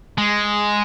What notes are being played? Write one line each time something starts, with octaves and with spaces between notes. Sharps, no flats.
G#3